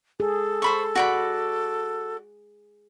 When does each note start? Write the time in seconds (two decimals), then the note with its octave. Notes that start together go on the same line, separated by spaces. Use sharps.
0.20 G#4 A4
0.62 C5 B5 C#6
0.95 F#4 D5 B5